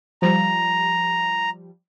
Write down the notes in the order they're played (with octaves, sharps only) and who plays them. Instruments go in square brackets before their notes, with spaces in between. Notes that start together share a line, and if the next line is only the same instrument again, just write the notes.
[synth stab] F3 G3 [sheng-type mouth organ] A#5